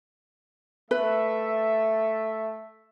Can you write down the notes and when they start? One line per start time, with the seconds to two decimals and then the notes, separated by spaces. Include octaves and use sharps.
0.91 A3 B4 E5